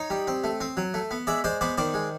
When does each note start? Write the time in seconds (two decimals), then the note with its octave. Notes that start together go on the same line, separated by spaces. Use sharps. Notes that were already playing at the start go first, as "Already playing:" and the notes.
Already playing: D#4 C#5 D#5
0.10 G3
0.27 C4
0.44 A3
0.61 C4
0.77 F#3
0.94 A3
1.11 B3
1.27 G#3 D5 E5
1.44 G#3 C5 D5
1.61 B3 C5 D5
1.78 D#3 C5 D5
1.94 G#3